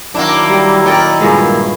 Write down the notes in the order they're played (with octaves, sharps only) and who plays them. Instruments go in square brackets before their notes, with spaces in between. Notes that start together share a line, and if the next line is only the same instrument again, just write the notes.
[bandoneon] D#3 F#3 E4 [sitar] A#3 D4
[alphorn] G3
[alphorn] A#2 [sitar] D#4 [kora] A#4 D5 G5
[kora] G2 A#2 G#3 [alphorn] A#3